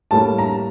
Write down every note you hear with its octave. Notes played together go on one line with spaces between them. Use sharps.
A2 G3 A#3 A5
A#5